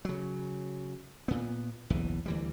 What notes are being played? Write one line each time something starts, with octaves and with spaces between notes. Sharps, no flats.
C#3 F#3
A#2 B3
F#1 B1 E2 E3
D2 E3 G3